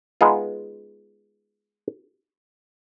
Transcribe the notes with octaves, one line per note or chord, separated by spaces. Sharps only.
G#3 B3 D#4 F4